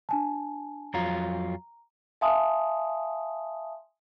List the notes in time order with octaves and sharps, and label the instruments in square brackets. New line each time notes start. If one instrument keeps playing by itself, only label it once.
[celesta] D4 G#5 A5
[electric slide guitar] F2 F#3 F4 [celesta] A#5
[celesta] E5 F5 G#5 A5 C6 D#6